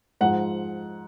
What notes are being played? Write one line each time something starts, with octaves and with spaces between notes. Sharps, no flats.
G#2 F3 F#5